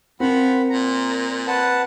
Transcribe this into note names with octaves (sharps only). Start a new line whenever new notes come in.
F3 C4 A#4 F#5 B5
A#2 A#5
B4 F#5 A5